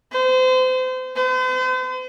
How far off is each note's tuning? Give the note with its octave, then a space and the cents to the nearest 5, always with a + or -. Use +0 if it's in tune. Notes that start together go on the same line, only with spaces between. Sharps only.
C5 -30
C5 -45